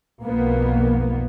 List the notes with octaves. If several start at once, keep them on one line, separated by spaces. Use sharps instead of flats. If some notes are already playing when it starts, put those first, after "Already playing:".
B1 F2 A#3 B3